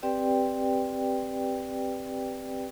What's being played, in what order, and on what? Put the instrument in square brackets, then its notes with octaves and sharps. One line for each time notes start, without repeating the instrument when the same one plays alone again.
[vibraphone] C4 G4 B4 D5 G5